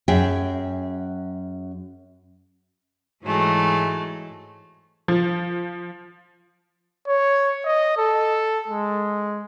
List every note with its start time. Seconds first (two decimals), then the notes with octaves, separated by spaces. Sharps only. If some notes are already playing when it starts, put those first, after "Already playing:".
0.08 F#2 G#4 E5 G5
3.23 G#2 E3 F#3 G#3 A3
5.08 F3
7.08 C#5
7.65 D#5
7.98 A4
8.68 G#3